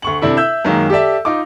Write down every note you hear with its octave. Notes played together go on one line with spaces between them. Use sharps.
D2 C#6 F#7
C3 D4 E4 A4
E5 E6 G6
F#2 D#3 G#3 A#3
G4 A4 D5 E5
D#4 F4 D6